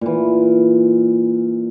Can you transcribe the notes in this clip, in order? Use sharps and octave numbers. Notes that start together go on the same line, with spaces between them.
A#2 E3